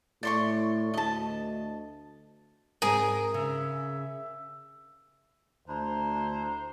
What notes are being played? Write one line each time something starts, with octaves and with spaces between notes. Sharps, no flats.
A2 D5 C6 C#6
D2 D#5 A5
G#2 C4 G#4 A#4 G#5
C#3 E5
D2 D4 E4 C5 A#5